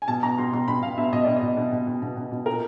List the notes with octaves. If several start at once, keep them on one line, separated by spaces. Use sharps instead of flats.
G#5
B2 A5
B2 A#5
B2 C6
B2 C6
B2 B5
B2 F5
B2 E5
B2 D#5
B2 D5
D#5
B2
B2
B2
B2
B2
B2
B2
A#2 A#4